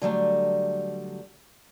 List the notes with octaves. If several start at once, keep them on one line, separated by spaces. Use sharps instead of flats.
D3 F#3 G3 A3